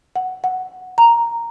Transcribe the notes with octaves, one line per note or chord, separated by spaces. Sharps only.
F#5
F#5
A#5